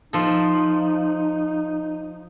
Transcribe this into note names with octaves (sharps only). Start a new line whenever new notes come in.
F3 D#4 A4